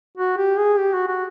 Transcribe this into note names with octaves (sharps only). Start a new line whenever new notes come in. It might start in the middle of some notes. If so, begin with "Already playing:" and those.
F#4
G4
G#4
G4
F#4
F#4